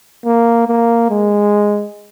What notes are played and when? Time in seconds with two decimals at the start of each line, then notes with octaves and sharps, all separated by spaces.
0.25 A#3
0.68 A#3
1.11 G#3